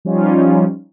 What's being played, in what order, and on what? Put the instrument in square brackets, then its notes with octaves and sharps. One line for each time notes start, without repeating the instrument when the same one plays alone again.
[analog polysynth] F3 G3 C#4 D#4 F4